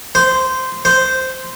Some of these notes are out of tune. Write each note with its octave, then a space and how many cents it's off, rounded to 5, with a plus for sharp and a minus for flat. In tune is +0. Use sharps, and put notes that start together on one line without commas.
C5 -15
C5 -10